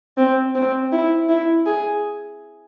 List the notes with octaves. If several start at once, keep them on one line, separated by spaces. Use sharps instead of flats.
C4
C4
E4
E4
G#4